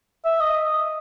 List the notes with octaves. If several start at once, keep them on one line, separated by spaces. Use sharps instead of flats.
E5
D#5